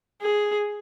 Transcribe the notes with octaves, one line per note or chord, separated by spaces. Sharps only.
G#4